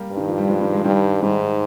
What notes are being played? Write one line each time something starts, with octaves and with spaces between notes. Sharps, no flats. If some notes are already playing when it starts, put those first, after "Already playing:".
Already playing: G3 A#3
G2
D#3
F3
G3
F3 G#3
D#3 G3
F3 G#3
G2 D#3 G3
G#2 D#3 G3